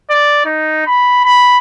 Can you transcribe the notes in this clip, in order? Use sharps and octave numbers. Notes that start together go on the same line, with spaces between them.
D5
D#4
B5
B5